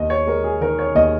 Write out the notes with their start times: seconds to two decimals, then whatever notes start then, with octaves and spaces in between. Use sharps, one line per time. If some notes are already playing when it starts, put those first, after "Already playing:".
Already playing: D#2 D#5
0.10 C#5
0.26 G#3 A#4
0.44 G#4
0.61 D#3 A#4
0.79 C#5
0.95 D#2 D#5